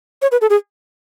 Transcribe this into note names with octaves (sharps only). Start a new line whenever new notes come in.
C#5
B4
A4
G#4